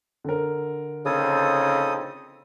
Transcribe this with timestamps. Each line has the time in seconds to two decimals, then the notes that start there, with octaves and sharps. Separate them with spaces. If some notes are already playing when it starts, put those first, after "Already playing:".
0.24 D3 A#4
1.06 A#1 C#3 C4 D#4 A4 D#6